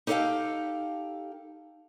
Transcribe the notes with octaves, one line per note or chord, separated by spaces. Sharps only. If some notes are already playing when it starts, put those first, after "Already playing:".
D#4 G4 A4 B4 F5 G5